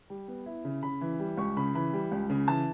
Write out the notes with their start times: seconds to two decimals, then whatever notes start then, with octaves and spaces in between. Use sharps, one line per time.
0.10 G3
0.28 B3
0.46 E4
0.64 C#3
0.83 C#3 B5
1.01 E3
1.19 G3
1.37 C#2 C#6
1.57 C#3 B5
1.74 E3 B5
1.93 G3
2.12 C#2
2.30 C#3
2.48 E3 A5